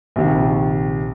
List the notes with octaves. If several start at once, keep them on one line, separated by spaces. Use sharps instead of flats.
A#1 C3 D#3